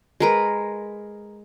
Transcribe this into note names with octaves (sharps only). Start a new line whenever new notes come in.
G#3 A#4 B4